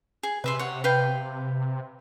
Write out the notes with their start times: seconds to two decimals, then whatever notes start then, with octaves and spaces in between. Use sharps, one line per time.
0.23 G#4
0.44 C3 B4 E5 C6
0.59 C#5 F#5
0.84 B4 F5 G5